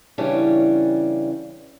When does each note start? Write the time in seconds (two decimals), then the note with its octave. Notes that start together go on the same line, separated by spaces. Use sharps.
0.18 C#3 E3 G3 C#4 D4